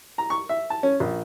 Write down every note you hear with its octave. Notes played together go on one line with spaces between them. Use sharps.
A#5
C#6
E5
A5
C#4
A#1